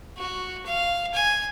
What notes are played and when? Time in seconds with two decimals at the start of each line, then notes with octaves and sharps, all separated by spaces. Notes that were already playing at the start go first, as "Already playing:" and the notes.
0.18 F#4
0.66 F5
1.14 G#5